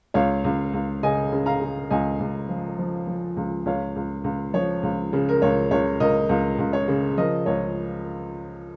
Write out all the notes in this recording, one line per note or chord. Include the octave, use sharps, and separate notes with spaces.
C#2 C#5 F5
C#2
C#2
C#3 D#5 G#5
C#3
F5 A#5
C#3
C#2 D#5 G#5
C#2
F3
F3
F3
C#2
C#2 C#5 F5
C#2
C#2
F3 C#5
C#2
C#3
A#4
C#2 C#5
C#2 C#5
C#2 A#4 D#5
C#2
C#2
C#5
C#3
F3 A#4 D#5
C#2 C#5